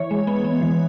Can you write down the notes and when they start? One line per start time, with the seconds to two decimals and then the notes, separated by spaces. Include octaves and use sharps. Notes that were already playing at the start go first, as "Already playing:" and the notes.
Already playing: E3 C#5
0.11 G#3
0.27 B3
0.44 B3
0.62 E3